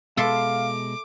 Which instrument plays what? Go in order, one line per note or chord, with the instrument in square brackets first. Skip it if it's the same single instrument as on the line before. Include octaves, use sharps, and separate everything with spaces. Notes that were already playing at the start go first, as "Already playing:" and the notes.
[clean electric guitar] B2 G#3 [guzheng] A4 E5 C6 [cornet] F5 [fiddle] D6